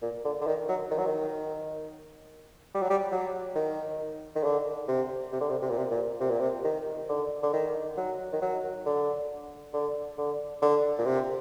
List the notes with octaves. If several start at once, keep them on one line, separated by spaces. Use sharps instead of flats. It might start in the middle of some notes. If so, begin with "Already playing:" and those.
A#2
D3
D3
D#3
F#3
D#3
F#3
D#3
G3
F#3
G3
F#3
D#3
D#3
D3
C3
C3
D3
C3
C3
A#2
C3
A#2
C3
A#2
C3
D#3
D3
D3
D#3
F#3
D#3
F#3
D3
D3
D3
D3
A#2
C3